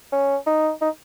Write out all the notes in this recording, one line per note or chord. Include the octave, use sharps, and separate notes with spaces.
C#4
D#4
D#4